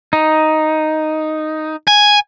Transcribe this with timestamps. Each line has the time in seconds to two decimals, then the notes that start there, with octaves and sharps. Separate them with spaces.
0.13 D#4
1.88 G#5